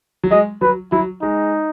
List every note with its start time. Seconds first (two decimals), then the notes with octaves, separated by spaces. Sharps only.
0.24 F#3
0.31 G#3 D#5
0.61 F#3 B4
0.92 F#3 E4
1.22 G#3 D#4